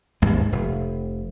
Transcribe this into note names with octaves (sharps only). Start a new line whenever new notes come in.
A#1 D#2 G#2 G#3
F1